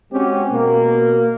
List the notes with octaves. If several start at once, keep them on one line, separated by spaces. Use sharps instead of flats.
G#3 C4 C#4 F#4 G4
B2 A#3